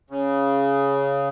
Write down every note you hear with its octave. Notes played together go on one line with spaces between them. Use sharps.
C#3